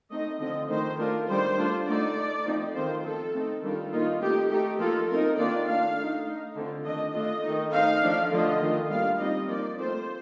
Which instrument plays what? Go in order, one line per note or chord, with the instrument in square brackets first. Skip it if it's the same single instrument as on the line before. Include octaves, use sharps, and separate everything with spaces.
[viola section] A3 C4 D#4 D#5
D3 F3 C4 D#5
D#3 A3 D#4 C5
A3 D4 F4 A#4
D#3 G3 D4 C5
A3 D4 F4
D3 A3 D#4 D5
A3 D#4
F3 A3 C4 D#4
D#3 A3 C4 F4 C5
F3 C4 F4 A4
A3 C4 D#4
D#3 G3 D4 F4 A4
D#3 A#3 D#4 F4
A3 C4 D#4 G4
A3 D#4 G4
F3 A#3 F4 A4
A3 C4 D#4 A#4
D#3 A#3 D4 F4 D5
A3 D4 F4 F5
A3 D#4
A3 D#4
D3 A3 C4 F4
D#3 A3 D4 D#5
A3 D4 F4 D#5
D#3 A3 D#4
A3 C4 D#4 F5
F3 A3 D4
D3 F3 A3 D4 F4 D#5
D#3 A3 D4 F4
G3 A#3 D4 F4 F5
G3 C4 D#4 D#5
F3 A#3 D#4 D5
A3 C4 F4 C5